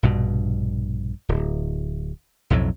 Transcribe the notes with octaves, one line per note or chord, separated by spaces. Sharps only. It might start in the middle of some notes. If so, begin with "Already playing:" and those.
A#1 G2 B2
D1
B1 F2 A2 F#3